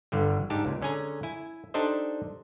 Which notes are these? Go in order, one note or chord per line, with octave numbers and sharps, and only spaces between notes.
G1 D3 G3
G#2 D4 D#4 G4 A5
C#2 A#2
D3 C#4 G#4 G#5 A#5
E4 G#5
D4 D#4 G4 A4 C5 D#5